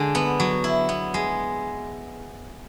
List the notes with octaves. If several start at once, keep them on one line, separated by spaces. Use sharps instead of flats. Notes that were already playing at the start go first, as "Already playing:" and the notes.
Already playing: D3 G#3
B3
F#3
E4
B3
G#3